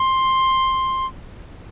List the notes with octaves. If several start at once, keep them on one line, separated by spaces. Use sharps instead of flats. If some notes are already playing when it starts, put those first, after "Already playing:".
Already playing: C6